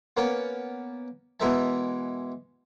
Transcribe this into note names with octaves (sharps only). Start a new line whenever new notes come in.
A#3 B3 C#4 A#4
B2 E3 G#3 A#4 E5 A5